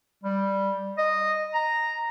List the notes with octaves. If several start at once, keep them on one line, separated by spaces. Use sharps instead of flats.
G3
D#5
A#5